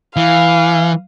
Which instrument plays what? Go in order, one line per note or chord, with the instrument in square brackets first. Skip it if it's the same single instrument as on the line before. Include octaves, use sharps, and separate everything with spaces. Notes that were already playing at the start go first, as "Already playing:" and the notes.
[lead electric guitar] E3 [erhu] F5